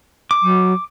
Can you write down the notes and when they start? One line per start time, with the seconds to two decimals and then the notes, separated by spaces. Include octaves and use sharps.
0.31 D6
0.43 F#3